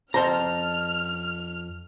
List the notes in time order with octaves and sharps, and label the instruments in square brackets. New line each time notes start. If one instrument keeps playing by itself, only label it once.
[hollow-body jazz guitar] F2 C5 A#5 [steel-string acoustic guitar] A5 [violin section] F6